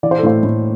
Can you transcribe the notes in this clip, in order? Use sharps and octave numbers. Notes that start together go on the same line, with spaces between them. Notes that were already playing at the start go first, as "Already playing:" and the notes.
E3 D5
C5
A4
A2 C5
A2